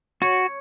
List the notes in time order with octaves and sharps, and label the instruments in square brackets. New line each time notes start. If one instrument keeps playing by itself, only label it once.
[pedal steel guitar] F#4 [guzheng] C#5